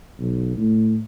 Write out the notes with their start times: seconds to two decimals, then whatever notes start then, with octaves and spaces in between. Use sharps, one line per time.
0.18 B1
0.56 A2